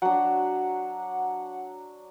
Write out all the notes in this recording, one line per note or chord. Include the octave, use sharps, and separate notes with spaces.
F#3 D4 F#5